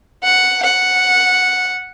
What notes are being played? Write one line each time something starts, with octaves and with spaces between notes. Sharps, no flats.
F#5
F#5